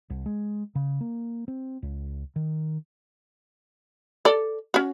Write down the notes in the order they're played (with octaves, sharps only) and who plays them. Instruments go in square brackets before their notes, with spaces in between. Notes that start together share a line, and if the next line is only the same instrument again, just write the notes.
[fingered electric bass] C2
G#3
C#3
A#3
C4
C#2
D#3
[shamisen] A4 D5
C#4 F#4